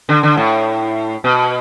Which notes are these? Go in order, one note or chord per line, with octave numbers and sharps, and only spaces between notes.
D3
D3
A2
B2